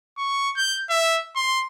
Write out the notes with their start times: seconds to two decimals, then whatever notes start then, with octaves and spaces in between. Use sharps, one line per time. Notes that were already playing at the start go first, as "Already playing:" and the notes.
0.18 C#6
0.56 G6
0.90 E5
1.36 C6